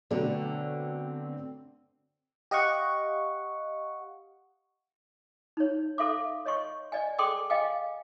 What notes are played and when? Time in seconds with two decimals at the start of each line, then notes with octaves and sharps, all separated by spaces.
0.11 B2 D3 F#3 A3 C4 D4
2.51 G4 D#5 F5 F#5 C#6
5.57 D#4 C#5
5.98 A4 E5 F5 C6 D6
6.46 C#5 D#5 C6 C#6
6.92 D5 D#5 G#5
7.18 G#4 A4 G5 C6 D6 D#6
7.50 D#5 F5 G5 G#5 D6